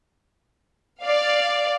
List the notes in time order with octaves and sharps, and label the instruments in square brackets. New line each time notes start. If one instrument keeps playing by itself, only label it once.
[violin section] D5 F5